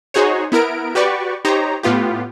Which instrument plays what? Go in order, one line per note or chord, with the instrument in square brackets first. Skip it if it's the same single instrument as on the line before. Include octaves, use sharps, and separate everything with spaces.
[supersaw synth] D#4 F#4 G#4 C5 C#5
B3 E4 A#4 D7
F#4 G4 B4 D5 C#6
D#4 G4 C5 C#5 A#5
A2 B3 F4 G4